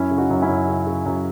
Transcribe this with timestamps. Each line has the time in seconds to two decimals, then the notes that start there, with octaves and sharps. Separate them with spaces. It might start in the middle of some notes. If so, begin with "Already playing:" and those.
Already playing: F#2 C#4 E4
0.11 C#3
0.17 D#4 F#4
0.31 F#2
0.42 C#4 E4
0.49 F#2
0.68 C#3
0.87 C#3
1.06 F#2